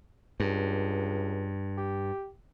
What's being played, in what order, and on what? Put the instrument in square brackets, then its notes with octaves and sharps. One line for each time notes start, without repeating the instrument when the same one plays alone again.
[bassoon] C#2 [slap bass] G2
[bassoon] G4